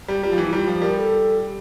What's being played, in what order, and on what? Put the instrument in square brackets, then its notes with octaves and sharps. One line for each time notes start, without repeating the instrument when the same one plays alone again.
[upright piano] G3
[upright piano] G3 [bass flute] F4
[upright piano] F3
E3
[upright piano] G3 [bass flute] F4
[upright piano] F3
[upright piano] G3 [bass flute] A#4
[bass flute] A4